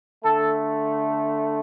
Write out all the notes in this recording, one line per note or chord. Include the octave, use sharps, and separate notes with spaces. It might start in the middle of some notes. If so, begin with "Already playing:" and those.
D3 A3 A4